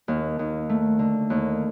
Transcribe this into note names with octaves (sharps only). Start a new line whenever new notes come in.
D#2
D#2
A3
D3
D#2